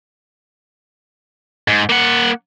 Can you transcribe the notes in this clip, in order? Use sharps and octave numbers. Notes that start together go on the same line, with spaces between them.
G#2
A#3 F#5